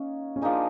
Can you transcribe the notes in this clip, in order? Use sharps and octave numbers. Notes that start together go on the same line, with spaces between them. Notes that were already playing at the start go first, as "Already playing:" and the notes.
Already playing: A#3 C#4 D#4
C#4
F3 A#3 D4 D#4 G#4